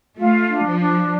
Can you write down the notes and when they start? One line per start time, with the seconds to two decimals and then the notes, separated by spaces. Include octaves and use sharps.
0.18 A3 F4
0.49 D4
0.64 F3
0.80 D4